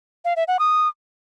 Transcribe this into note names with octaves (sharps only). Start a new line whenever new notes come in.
F5
E5
F#5
D#6